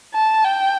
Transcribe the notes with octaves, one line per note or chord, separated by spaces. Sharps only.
A5
G5